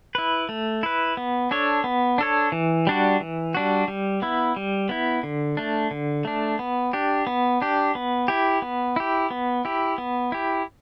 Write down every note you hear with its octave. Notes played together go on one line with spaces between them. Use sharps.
E4 B4
A3
E4 B4
B3
D4 A4 C#5
B3
D4 A4 C#5
E3
G3 D4 F#4
E3
G3 D4 F#4
G3
B3 E4
G3
B3 E4
D3
A3 D4
D3
A3 D4
B3
D4 G4
B3
D4 G4
B3
E4 G4
B3
E4 G4
B3
E4 G4
B3
E4 G4